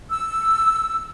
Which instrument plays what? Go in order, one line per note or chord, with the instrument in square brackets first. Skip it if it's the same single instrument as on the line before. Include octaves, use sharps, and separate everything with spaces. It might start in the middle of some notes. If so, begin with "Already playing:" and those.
[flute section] E6